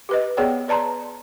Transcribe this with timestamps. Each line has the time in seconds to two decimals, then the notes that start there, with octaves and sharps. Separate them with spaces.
0.09 G4 B4 D#5
0.37 B3 G#4 C#5 D5 G5
0.68 B4 D5 A5 A#5 C6